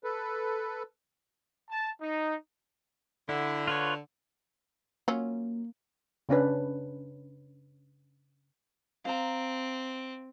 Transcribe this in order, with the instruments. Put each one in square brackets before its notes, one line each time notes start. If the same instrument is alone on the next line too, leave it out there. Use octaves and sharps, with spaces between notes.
[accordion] A4 B4
[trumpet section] A5
D#4
[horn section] D3 [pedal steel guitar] E4
[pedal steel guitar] F4 B4 C#5
[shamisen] F#3 C#4 F4 [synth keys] A#3
[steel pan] C#3 C#4 D4 B4
[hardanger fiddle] C4 [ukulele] F5 A#5